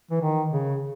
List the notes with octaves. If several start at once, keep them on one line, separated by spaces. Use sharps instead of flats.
E3
D#3
C#3